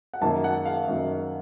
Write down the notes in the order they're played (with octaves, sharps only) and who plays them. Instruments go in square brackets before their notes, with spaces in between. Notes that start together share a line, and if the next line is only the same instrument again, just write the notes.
[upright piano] F#5
F#2 D#3 A#3 A5
F#5
F5
F#2 D#3 A#3